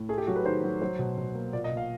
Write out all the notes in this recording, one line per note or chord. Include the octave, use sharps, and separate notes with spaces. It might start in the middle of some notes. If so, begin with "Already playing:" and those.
Already playing: A2
A3 G#4
G4
F#3 F#4
B4
D#3 C5
F#3
F#3 C5
B2
B2
A#3
A#2 D5
D#5
A#2
F5